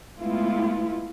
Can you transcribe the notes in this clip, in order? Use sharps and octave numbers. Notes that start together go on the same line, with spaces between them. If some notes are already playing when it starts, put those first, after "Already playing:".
G#3 A3 B3 E4 F4